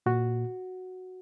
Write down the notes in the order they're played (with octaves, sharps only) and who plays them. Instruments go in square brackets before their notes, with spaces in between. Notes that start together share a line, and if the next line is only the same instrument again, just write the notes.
[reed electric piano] A#2 F#4